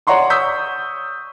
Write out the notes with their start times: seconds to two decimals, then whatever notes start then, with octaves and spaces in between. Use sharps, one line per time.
0.07 C#5 D5 F#5 A#5 C6 C#6
0.30 C#6 D#6 E6 G6 B6